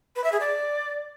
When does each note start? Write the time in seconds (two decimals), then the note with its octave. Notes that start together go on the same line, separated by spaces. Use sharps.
0.16 B4
0.24 E5
0.32 G#4
0.40 D5